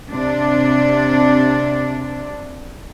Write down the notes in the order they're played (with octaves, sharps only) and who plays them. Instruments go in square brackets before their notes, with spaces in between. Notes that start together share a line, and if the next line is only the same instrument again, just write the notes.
[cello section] C3 D4